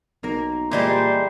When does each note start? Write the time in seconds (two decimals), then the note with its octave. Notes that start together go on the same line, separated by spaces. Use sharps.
0.23 B1 A#3 A#4
0.71 A#2 E3 G3 G#3 A#3 C5 D5